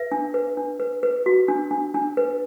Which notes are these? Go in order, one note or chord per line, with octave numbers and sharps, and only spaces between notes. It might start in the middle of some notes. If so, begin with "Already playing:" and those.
Already playing: B4 E5
D4
B4
D4
B4
B4
F#4
D4
D4
D4
B4